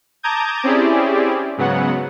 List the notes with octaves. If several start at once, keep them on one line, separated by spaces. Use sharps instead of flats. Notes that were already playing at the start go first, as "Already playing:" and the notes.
A5 A#5 D6 D#6 G6 G#6
C4 C#4 E4 G4 G#4 D5
G#2 C#3 F#3 B3 F#5